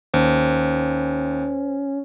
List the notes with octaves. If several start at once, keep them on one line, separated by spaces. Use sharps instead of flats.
D#2 C#4 C5